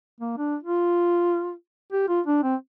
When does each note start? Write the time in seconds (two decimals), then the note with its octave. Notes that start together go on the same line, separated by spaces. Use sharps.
0.21 A#3
0.38 D4
0.63 F4
1.92 G4
2.08 F4
2.27 D4
2.43 C4